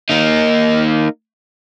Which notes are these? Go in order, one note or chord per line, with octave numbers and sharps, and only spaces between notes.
A#3 D#4